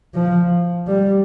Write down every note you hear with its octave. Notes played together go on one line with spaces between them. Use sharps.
F3
G3